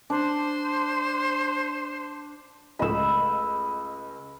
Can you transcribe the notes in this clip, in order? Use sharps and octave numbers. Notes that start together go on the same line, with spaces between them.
D4 C5
C#2 A3 D#5 B5 E6